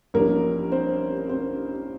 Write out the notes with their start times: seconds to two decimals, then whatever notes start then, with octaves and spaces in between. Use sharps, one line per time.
0.14 A1 G2 F3 A#3 A#4
0.72 C4 C5
1.29 C4 C5